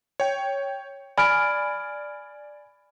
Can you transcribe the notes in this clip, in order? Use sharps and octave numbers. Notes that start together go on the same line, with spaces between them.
C#5 G5
D5 G#5 B5 F6 D7